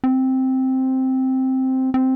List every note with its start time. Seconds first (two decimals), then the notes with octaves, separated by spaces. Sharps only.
0.04 C4
1.94 C4